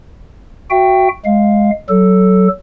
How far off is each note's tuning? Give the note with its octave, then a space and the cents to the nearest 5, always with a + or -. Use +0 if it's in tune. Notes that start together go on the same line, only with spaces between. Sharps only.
F#4 +0 E5 +30 G5 +0
G#3 +0 F5 +0
F#3 +20 A4 +0